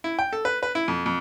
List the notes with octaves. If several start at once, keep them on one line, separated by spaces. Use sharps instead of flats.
E4
G5
A4
B4
B4
E4
F2
F2